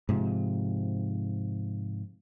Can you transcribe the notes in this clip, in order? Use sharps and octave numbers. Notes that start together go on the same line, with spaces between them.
G#2 C3 F3